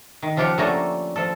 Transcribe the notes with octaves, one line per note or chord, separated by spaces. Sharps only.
D#3
C#3 F3 F4 G4 F#5
D3 A3 A#3 C#4 A4 A#5
F3 A4